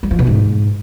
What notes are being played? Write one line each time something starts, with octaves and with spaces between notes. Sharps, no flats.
G3
F3
B2
G#2